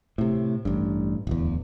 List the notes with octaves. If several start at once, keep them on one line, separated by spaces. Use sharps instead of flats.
A2 C3
A1 G2
D1 E2